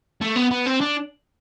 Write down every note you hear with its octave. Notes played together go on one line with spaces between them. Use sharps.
A3
B3
B3
C4
D4